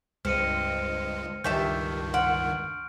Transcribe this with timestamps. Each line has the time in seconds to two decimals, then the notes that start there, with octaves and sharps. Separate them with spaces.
0.25 C#2 G2 G#3 C4 F6 C#7 D#7
1.44 C#2 G2 D#3 G4 E5 A5 C#6 G6
2.14 F#5 C6 F6 D7